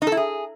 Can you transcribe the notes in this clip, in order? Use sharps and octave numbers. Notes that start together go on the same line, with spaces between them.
D#4
A4
E4
G#4